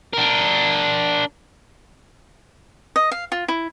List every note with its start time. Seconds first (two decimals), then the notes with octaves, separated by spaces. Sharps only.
0.14 D4 A#4
2.96 D#5
3.12 F5
3.32 F4
3.48 E4